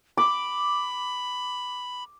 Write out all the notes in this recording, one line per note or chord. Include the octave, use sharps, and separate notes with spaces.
B5 D6